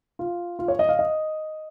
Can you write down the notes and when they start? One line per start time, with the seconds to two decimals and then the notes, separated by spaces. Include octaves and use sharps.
0.19 F4
0.59 F4
0.68 C#5
0.79 D#5
0.89 F5
0.99 D#5